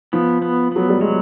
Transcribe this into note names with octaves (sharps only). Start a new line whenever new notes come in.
F3 B3
B3
F#3 B3
G3
F#3 G#3